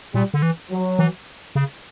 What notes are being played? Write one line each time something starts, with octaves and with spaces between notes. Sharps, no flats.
A#2 G3
D3
E3
F#3
E3
C#3